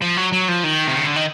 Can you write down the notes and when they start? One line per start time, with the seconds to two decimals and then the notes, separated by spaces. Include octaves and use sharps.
0.02 F3
0.17 F#3
0.33 F#3
0.49 F3
0.64 D#3
0.87 C3
0.96 C#3
1.06 D3
1.16 D#3